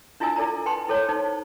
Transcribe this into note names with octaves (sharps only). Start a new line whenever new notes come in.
D4 E4 F4 D#5 G#5 E6
E4 A4 D5 G#5 A#5
B4 G5 A5 C6
E4 A4 C5 C#5
D#4 C5